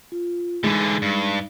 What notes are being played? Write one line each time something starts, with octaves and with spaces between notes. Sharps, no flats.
F4
D3 E3 G#3 D#4
G2